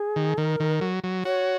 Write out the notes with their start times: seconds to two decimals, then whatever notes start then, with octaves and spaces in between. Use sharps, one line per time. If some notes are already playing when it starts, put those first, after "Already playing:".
Already playing: G#4
0.16 D#3
0.38 D#3 A#4
0.60 D#3
0.81 F#3
1.04 F#3
1.25 F#4 C#5